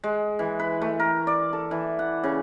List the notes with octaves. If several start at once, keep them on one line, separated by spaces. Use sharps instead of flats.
G#3
E3
B4
A3
A#4
D5
A4
E3
F#5
C#3